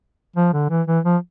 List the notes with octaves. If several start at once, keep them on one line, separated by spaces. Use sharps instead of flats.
F3
D3
E3
E3
F3